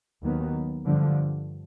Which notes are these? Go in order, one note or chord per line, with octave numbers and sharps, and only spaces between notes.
D#2 D#3 F#3 B3
G2 D3 F3